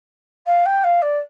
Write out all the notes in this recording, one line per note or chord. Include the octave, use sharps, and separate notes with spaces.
F5
G5
F5
D5